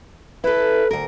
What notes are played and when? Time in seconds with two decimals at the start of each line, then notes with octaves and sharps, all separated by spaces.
0.44 E4 A4 B4
0.91 D2 A#4